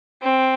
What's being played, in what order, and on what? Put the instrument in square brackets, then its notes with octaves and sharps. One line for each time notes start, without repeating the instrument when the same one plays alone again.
[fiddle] C4